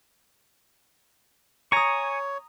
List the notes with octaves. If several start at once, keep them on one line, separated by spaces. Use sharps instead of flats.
C#5 G#5 A#5 C#6 D#6